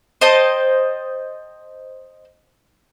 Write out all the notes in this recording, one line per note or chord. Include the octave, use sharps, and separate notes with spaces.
C5 D#5 G5 A5